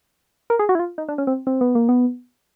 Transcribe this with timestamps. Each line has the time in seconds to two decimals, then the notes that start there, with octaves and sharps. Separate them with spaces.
0.50 A#4
0.59 G#4
0.69 F#4
0.75 E4
0.79 F4
0.98 D#4
1.09 D4
1.18 C#4
1.27 C4
1.47 C4
1.61 B3
1.75 A#3
1.89 B3